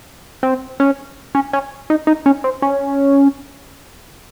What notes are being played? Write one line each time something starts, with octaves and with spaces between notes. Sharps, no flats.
C4
C#4
C#4
C#4
D#4
D#4
C#4
C4
C#4